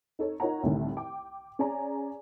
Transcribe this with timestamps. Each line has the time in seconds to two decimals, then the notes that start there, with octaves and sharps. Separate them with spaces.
0.19 D#4 A4 C#5
0.40 D#4 F4 A#4 C#5 F#5 A#5
0.63 C2 A2 D3 D#3
0.97 G5 D6
1.59 C#4 G#4 D5 G#5 A#5